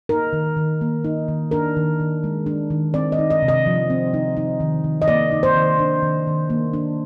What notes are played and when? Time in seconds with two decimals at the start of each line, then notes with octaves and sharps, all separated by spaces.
0.09 D#4 A#4
0.33 D#3
0.57 D#3
0.81 A#3
1.04 D#4
1.28 D#3
1.51 D4 A#4
1.76 D#3
2.00 D#3
2.24 G#3
2.46 D4
2.70 D#3
2.94 C4 D5
3.12 D#5
3.19 D#4
3.30 D#5
3.42 C3
3.48 D#5
3.66 F3
3.90 C4
4.14 D#4
4.37 D#4
4.60 D#3
4.84 D#3
5.02 D#5
5.08 A#3 D5
5.32 D#4
5.43 C5
5.56 D#3
5.79 D4
6.02 D#3
6.27 D#3
6.50 A#3
6.73 D4